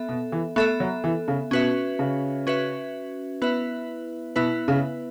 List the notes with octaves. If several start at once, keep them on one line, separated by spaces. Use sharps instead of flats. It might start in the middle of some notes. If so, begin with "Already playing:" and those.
Already playing: B3 A4 E5
B2
E3
A3 B3 A4 E5
F#3
E3
C#3
B2 C#4 F#4 B4 E5
C#3
C#4 F#4 B4 E5
B3 E4 B4 E5
B2 B3 E4 B4 E5
C#3